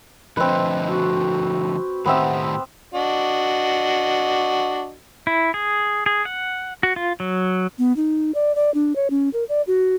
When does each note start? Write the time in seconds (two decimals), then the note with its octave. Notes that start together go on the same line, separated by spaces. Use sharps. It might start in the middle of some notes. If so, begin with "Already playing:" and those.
0.37 D3 F3 A3 C4 B4 D#5
0.88 F#4 C#6
2.06 A2 D#3 B3 C4 G4 E5
2.94 D4 F#4 D#5
5.27 E4
5.54 G#4
6.06 G#4
6.25 F#5
6.83 F#4
6.96 F4
7.20 F#3
7.79 B3
7.96 D#4
8.35 D5
8.55 D5
8.74 D4
8.96 C#5
9.10 C#4
9.33 A#4
9.49 D5
9.67 F#4